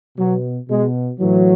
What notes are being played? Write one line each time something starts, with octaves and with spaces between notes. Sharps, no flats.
B2 F#3
B2 G#3
A2 E3 F#3